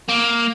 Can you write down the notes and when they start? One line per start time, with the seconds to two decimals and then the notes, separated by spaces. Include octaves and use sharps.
0.09 A#3